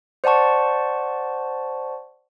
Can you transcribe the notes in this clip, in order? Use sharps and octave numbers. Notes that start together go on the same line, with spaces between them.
C5 D5 F#5 A5 C#6